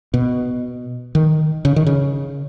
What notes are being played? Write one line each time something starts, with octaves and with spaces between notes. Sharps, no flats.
B2
D#3
C#3
D#3
C#3